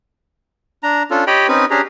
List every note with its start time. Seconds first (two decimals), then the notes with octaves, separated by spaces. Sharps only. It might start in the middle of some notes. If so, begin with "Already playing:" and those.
0.83 D4 A#5
1.11 C#4 D4 F4 A4
1.27 G4 C#5 D#5 G5 B5
1.48 C4 C#4 D#4 B4
1.71 C#4 D4 G4 G#4 A#5